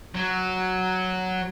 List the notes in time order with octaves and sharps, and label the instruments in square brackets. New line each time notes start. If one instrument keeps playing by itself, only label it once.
[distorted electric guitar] F#3